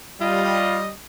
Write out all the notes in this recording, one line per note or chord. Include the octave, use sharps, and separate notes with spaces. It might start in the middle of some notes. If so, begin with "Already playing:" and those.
G3 F4 D#5